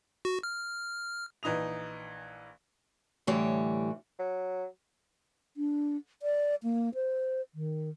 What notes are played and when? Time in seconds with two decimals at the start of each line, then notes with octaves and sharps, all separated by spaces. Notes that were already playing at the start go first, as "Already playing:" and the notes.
0.25 F#4
0.43 F6
1.43 A#1 E3 D#4 D#6 F7
3.27 A2 D3 E3 G3 C#5
4.19 F#3
5.57 D4
6.22 D5
6.63 A#3
6.94 C5
7.54 D#3